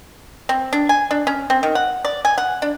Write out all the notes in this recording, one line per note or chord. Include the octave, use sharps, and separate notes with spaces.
C4
D4
G#5
D4
C#4
C4
D#3
F#5
D5
G#5
F#5
D4